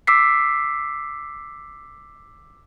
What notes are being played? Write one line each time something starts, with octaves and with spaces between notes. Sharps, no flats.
D6 E6 B6 C7